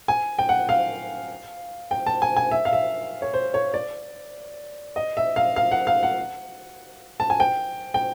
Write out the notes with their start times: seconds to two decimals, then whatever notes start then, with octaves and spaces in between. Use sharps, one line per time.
0.08 G#5
0.39 G5
0.49 F#5
0.69 F5
1.91 G5
2.06 A5
2.22 G#5
2.37 G#5
2.51 E5
2.65 F5
2.73 E5
3.22 C#5
3.34 C5
3.54 C#5
3.74 D5
4.96 D#5
5.17 E5
5.36 F5
5.56 F5
5.72 F#5
5.87 F5
6.03 F#5
7.20 A5
7.30 G#5
7.40 G5
7.94 G5